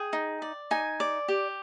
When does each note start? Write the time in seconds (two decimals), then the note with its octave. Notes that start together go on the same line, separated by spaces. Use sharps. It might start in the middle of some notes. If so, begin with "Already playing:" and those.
Already playing: G#4 G5
0.13 D#4
0.42 D5
0.71 D#4 G#5
1.00 D5
1.28 G4